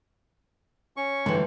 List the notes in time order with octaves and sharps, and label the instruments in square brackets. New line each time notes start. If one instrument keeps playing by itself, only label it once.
[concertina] C#4 C#6
[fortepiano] G#2 G3 [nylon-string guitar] D3 E3